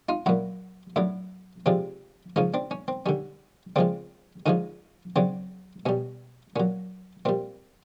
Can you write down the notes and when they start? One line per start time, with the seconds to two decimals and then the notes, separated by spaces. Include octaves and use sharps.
0.09 D#4 F4
0.26 A#2 F#3 E4 F#4
0.96 A2 F#3 D4 E4
1.66 C3 F3 G#3 C4 D4
2.36 C#3 F3 G#3 C#4 D#4
2.54 C4 D4
2.71 C#4
2.88 C4
3.06 D3 G3 C#4
3.76 C#3 F3 G#3 C4 D4
4.46 D3 F3 G#3 C#4 D#4
5.16 C#3 F#3 C4 D4
5.86 B2 G3 C#4
6.56 A#2 F#3 C#4
7.25 A#2 G3 C4